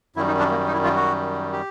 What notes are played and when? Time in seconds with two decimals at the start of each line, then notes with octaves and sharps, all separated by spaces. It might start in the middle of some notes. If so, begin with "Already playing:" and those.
0.16 F#2 D#3 G3 E4
0.27 D#4
0.39 D4
0.51 A#3
0.67 D#4
0.73 E4
0.84 F4
0.96 F#4
1.52 G4